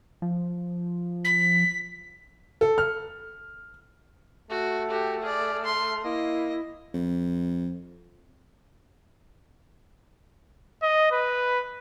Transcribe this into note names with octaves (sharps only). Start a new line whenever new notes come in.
F3
B6
A4
F6
A3 F#4
F#4 G4 A4
G#4 D5 F6
C6
A#3 E4 D#5
F2
D#5
B4